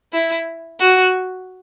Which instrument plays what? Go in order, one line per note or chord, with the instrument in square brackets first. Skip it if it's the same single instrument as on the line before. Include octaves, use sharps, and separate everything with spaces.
[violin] E4
F#4